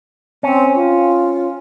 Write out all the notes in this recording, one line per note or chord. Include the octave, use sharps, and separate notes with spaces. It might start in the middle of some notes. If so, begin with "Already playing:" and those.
C4 C#4
F4